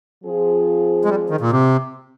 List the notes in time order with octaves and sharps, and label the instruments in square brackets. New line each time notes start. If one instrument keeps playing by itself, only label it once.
[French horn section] F3 C4 F4 G#4
[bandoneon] G#3
G3
D#3
A#2
C3